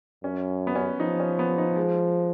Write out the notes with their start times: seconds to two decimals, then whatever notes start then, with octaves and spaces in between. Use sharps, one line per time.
0.24 F#2 C#4
0.67 B3
0.75 C#4
1.00 F3 D#4
1.20 C#4
1.39 B3
1.58 D#4
1.76 G#3